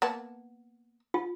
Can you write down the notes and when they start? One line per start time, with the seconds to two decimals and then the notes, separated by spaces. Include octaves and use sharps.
0.02 A#3 B3 A5
1.14 F4